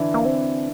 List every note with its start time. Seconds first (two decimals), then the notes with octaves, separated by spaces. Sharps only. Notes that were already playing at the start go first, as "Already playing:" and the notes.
Already playing: D3 E3 D4 E4
0.14 A#3
0.25 C4